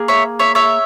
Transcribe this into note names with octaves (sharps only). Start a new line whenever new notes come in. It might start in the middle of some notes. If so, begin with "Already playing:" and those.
Already playing: A#3 G#4
C#5 E5
C#5 E5
C#5 E5